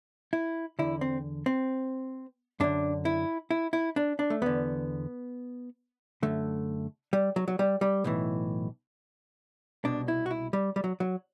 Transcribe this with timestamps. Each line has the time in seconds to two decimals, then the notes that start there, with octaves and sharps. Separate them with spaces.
0.33 E4
0.79 E2 D3 E4
1.01 C4
1.46 C4
2.60 F#2 D3 D4
3.05 E4
3.51 E4
3.73 E4
3.96 D4
4.19 D4
4.30 A3
4.42 E2 D3 B3
6.23 F#2 D3 A3
7.13 G3
7.36 F#3
7.48 F#3
7.59 G3
7.81 G3
8.04 B1 A2 E3
9.85 C2 B2 D4
10.08 E4
10.26 F#4
10.31 E4
10.53 G3
10.76 G3
10.84 F#3
11.00 F#3